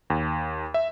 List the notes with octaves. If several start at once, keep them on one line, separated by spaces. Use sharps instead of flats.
D#2
E5